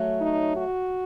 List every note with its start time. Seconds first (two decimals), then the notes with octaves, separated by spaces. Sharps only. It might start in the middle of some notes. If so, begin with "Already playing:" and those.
Already playing: F#3 A3 C#4
0.21 D#4
0.56 F#4